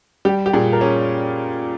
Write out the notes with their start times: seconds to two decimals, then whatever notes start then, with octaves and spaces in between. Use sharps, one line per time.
0.25 G3 G4
0.46 G4
0.53 A#2 G#4
0.73 A#4
0.81 C#4 G#4